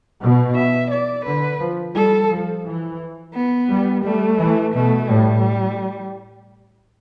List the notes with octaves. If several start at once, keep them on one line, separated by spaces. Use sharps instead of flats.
B2
E5
D5
D3 B4
F3
G3 A4
F3
E3
B3
G3
G3 A3
E3
B2 A3
A2 G3